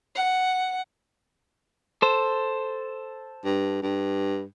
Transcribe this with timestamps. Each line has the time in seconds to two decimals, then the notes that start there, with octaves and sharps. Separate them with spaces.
0.15 F#5
2.02 A4 C5
3.45 G2
3.82 G2